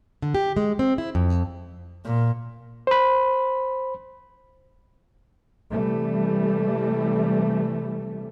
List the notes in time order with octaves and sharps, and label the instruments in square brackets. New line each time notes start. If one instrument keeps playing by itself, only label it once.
[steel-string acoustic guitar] D3
G4
G#3
C4
E4
F2
[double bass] A#2
[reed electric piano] C5 B5
[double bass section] C3 E3 G3 A3